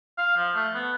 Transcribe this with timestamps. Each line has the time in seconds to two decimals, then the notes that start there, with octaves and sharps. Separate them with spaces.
0.18 F5
0.36 F3
0.54 A3
0.74 B3